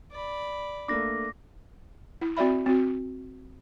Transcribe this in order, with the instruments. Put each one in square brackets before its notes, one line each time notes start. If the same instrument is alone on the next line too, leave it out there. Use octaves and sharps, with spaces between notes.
[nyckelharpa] D5 B5
[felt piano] A3 A#3 D4 [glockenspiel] D6 A#6
[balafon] E4
C4 F#4 D5 E5 B5
C4 F#4